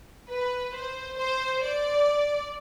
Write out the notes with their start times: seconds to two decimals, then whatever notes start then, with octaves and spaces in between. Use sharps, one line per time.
0.29 B4
0.74 C5
1.18 C5
1.63 D5